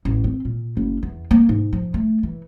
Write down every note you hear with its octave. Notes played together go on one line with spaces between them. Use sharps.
A1
C4
A#2
F#1
E2
A#3
G#2
F3
A3
E3